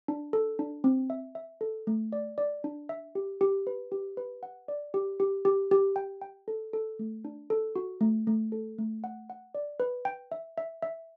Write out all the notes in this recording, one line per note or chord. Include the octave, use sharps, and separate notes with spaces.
D4
A4
D4
C4
E5
E5
A4
A3
D5
D5
D4
E5
G4
G4
B4
G4
B4
F#5
D5
G4
G4
G4
G4
G5
G5
A4
A4
A3
D4
A4
F#4
A3
A3
A4
A3
F#5
F#5
D5
B4
G5
E5
E5
E5